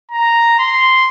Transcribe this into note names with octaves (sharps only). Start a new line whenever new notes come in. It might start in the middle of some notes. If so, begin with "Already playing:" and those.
A#5
C6